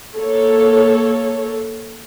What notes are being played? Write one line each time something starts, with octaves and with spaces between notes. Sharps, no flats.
A#3 A4 C#5